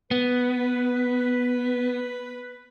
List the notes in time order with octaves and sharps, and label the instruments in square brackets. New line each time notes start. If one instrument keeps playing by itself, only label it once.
[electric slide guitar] B3 [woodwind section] B4